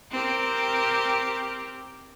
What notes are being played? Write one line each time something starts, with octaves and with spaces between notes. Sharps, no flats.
C4 G4 A#4